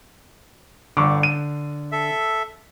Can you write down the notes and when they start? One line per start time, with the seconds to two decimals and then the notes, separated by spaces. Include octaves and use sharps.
0.97 G1 D3 C#6 D6
1.23 D#7
1.92 A4 E5